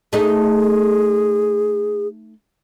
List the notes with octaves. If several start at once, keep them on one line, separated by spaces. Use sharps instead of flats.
A3 D#4 G#4